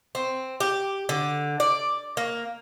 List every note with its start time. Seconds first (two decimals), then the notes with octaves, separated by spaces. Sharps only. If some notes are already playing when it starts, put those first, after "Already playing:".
0.15 C4
0.60 G4
1.09 D3
1.60 D5
2.17 A#3